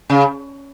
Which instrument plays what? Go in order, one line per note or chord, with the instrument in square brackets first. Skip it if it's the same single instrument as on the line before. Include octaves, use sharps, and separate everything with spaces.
[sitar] C#3